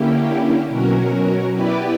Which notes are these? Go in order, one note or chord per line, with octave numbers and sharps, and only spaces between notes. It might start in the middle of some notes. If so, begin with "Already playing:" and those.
Already playing: D3 A#3 C#4 E4 G4
B2 F#3 C#4 F#4 A#4
B3 E4 G4 B4 D5